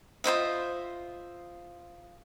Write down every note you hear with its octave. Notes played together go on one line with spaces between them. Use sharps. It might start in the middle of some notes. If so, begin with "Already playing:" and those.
F4 C5 D#5 E5